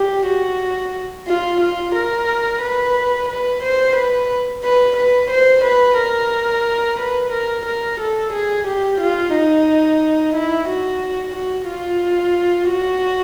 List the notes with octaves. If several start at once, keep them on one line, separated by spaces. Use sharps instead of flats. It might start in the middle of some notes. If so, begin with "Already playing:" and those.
Already playing: G4
F#4
F4
F4
A#4
B4
B4
C5
B4
B4
B4
C5
B4
A#4
B4
A#4
A#4
A4
G#4
G4
F4
D#4
E4
F#4
F#4
F4
F#4